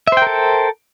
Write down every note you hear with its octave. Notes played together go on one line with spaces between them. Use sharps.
A4 A#4 C5 E5 G5